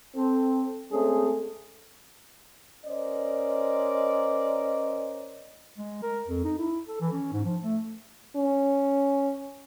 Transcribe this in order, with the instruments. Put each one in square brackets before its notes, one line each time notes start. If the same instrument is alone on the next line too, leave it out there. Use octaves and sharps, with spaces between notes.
[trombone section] C4 A4
G#3 A3 C4 C#4 G#4 A4
[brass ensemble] C#4 A#4 C5 D5 D#5
[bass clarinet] G#3
A#4
F2
D#4
E4
A4
E3
C#4
G#2
F3
A3
[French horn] C#4